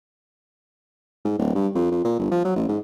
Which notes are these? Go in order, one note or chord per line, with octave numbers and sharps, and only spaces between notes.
G#2
D1
G2
F2
F2
A#2
G1
F3
F#3
A1
G#2